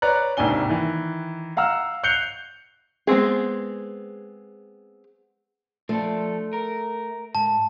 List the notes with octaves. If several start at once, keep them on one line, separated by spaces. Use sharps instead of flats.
B4 C#5 D5 A#5 F#6
G#1 D#2 C3 D4 G#5 G7
D#3 E3
F5 F#5 A#5 E6 F6
F#6 G6 C7 C#7 F7 G7
G#3 B3 C4 G#4
F3 A3 D4 A4
A#4
G#2 A5